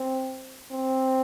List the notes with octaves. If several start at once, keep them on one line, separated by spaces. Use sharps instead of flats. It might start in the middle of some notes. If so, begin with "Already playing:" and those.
Already playing: C4
C4